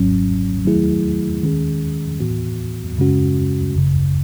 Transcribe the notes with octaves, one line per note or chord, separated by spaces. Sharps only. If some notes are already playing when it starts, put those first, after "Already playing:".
Already playing: G#1 G#2 F#3 C#4
D#3 F#3 A3 E4 G#4
D#3 G#3 C#4 G#4
A2 E3 B3 F#4
F#2 C#3 G#3 C#4 F#4
G#1 F#2 C#3